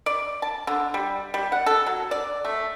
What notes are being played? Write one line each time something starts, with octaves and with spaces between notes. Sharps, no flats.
D5
A5
D3
G3
G3
F#5
A4
F#3
D5
A3